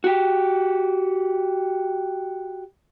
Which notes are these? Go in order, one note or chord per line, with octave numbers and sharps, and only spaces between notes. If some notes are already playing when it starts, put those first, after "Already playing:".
F#4 G4